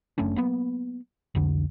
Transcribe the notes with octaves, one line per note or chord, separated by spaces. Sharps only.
F#1 A3 C#4 D4
F#3 A#3 B3
F1 C2 F2 D3